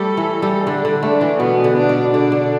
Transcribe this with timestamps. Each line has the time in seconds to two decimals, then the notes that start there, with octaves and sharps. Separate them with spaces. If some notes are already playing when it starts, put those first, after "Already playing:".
Already playing: G3 A3 A4
0.17 E3
0.42 G3
0.66 D3 D4
0.85 D3
1.03 A3 D4
1.21 E3
1.40 B2 B3
1.64 D3
1.77 D4
1.89 B2
2.14 D3 D4
2.32 D3